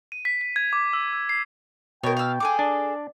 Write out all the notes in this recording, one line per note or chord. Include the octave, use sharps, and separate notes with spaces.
D#7
B6
B6
G#6
D6
E6
E6
C7
B2 A#4 C#5 G5
F5 E6
G#4 A4 D6
D4 D5